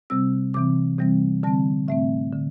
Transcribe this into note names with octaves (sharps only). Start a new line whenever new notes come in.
C3 G3 C4 E6
C3 E3 C4 D6
C3 E3 G3 C4
D3 G3 C4 A5
A2 A3 C4 E5
D3